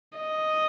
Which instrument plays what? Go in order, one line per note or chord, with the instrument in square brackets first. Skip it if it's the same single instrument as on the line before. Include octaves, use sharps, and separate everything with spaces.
[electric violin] D#5